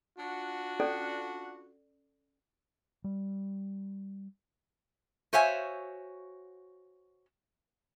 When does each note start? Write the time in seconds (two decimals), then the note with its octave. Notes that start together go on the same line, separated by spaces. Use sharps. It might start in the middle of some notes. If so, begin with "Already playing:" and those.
0.18 D4 F4 F#4
0.80 C#4 A4 D5
3.04 G3
5.33 F#4 C5 C#5 E5 F5 G#5